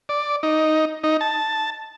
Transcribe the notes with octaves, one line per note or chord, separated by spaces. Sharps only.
D5
D#4
D#4
A5